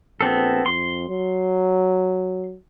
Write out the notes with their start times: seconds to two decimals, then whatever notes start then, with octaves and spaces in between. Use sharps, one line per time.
0.21 A#1 B3 C4 A4
0.66 F2 C6
1.09 F#3